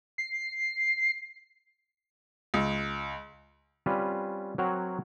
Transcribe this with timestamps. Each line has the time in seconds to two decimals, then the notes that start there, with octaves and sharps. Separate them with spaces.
0.18 C7
2.54 C#2
3.86 G3 C4 C#4 F4 B4
4.58 F#3 C4 A#4 C#5 F#5